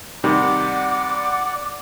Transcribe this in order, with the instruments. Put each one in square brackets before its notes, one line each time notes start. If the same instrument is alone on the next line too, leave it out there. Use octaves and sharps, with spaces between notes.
[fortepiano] C3 D#3 G3 [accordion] D5 F#5 [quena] D6